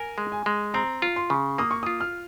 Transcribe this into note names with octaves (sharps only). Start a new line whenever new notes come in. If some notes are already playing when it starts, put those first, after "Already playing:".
Already playing: A#4 G#5
G#3
G#5
G#3
C4 A#5
F4
C6
C#3
A#3 D#6
C#6
F4 D#6
F6